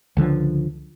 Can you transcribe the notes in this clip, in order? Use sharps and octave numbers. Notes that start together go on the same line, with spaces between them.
C#2 D3 F3